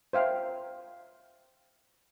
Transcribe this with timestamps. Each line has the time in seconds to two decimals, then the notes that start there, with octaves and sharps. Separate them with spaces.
0.13 C5 E5 F5 G5